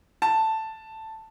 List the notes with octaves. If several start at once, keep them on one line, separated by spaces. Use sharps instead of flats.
A5